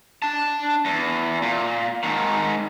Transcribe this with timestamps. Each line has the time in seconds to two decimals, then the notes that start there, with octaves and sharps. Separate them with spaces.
0.22 D4 A5
0.85 E2
1.42 A#2
2.03 G#2 D#3